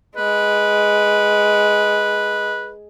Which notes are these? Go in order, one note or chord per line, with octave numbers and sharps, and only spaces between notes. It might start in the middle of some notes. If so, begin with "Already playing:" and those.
G#3 B4